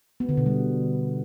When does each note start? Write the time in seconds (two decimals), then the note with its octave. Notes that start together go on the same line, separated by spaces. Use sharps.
0.20 B3
0.29 D3
0.37 B2
0.46 G3